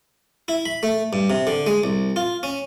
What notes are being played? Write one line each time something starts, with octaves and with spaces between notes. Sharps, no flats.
E4
B5
A3
G2
C3
D3
G#3
C2
F4
C#4